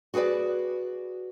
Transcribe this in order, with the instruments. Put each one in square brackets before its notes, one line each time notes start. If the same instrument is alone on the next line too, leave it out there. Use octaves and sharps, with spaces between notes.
[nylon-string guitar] F#4 G#4 A#4 B4 D5